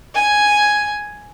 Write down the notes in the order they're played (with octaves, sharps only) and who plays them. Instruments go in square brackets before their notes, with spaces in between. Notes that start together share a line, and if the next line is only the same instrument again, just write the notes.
[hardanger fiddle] G#5